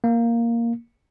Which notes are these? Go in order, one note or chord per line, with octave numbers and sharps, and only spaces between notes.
A#3